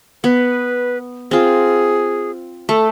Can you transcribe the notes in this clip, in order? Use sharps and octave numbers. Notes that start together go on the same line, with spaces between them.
B3 B4
C4 F4 G#4
A3 A4